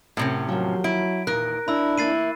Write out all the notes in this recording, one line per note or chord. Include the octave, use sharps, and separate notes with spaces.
F#2 A2 C3 C#4 F#5
D#2 F3 F#3
E4 D7
E2 A#2 D#3 A#4 F#6
D4 E4 B5 E6
E3 A#3 E4 A6 C7 D#7